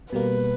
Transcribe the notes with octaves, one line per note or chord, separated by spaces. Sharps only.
B2 G3 A#3 B4